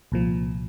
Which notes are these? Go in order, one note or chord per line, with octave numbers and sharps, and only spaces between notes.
C2 A#2 F3